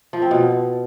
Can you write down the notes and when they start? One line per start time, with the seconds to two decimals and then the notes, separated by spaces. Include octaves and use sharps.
0.13 F3
0.22 C4
0.31 B2